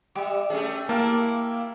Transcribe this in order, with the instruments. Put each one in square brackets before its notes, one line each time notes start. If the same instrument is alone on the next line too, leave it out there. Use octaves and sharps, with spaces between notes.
[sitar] G3 [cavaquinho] G4 E5
[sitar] A3 C#4 G#4
[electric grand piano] A#3 [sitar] E4 [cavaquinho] G4 F5 A5